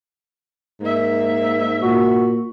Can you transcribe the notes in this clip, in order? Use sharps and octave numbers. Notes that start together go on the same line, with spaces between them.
G#2 A#3 E5
A#2 F#4